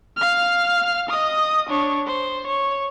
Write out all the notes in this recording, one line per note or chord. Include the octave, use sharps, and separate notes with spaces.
F5 F6
D#5 D#6
D4 C#5
C5
C#5